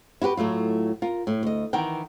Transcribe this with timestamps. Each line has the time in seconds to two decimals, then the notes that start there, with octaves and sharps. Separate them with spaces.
0.22 E4 F#4 G4 B4
0.37 A2 F#3 A3 F4
1.02 F4 A#4
1.27 A2
1.43 D2 D#5
1.73 D#3 E3 A#4 F#5 G5